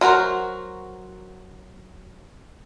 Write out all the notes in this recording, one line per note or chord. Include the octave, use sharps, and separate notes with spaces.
F#3 F4 F#4 A#4 C5